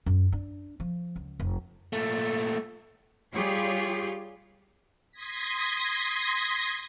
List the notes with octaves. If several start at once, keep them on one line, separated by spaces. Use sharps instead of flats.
F#2
D4
F3
C#2
F1
A#2 A3
G3 F4 G4 G#4 C#5
C6 D#6 G#6 A#6 B6